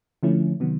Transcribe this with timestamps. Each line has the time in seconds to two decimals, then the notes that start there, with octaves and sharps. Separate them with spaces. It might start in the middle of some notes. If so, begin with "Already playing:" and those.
0.23 D3 F3 A3 C#4 E4
0.60 C3 D#3 F#3 B3